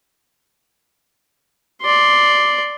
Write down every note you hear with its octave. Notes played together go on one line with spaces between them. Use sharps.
D5 C6